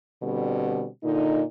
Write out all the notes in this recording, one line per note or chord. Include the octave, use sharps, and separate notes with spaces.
B2 D3 G3 C4
A#2 D3 D#4